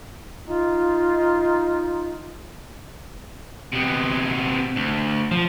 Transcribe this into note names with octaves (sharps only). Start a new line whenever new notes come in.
D#4 F4
C3 B3
D2
F3